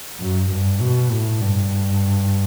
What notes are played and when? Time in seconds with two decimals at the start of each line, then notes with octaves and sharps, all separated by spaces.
0.20 F#2
0.51 G2
0.81 B2
1.11 A2
1.41 G2